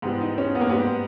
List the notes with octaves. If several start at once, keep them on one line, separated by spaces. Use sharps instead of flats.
G#2 E3 G3 B3
D#4
C#4
B3
A#3
G#2 G3 B3